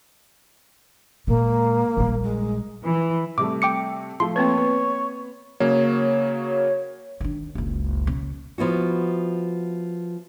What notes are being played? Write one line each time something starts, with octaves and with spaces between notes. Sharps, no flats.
A#2 G#3 A#3
A#1 G3
G#3
E3
C3 G3 A3 D6
G5 D6 C#7
F3 A3 C6
A#3 C4 B4 C#5
B3
C#3 F#3 A#3 C#5
D#3 D4
F#1 C#2
C#3
F3 B3 E4 F#4